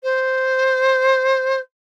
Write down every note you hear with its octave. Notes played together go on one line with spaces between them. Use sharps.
C5